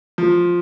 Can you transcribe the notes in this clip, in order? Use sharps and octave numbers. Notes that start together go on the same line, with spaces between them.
F3